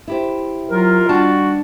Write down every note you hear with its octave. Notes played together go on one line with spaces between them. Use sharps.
E4 G4 C5
F#3 F4 A#4
D#3 G3 D4 F#4 A5